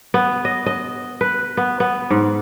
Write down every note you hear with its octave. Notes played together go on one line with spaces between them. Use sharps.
B3
D#5
D#5
B4
B3
B3
G#2